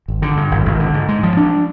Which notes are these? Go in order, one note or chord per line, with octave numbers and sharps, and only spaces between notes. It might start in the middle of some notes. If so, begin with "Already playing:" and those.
G#1
D3
G2
G#1
G#1
D3
G#2
G#3
F3
D4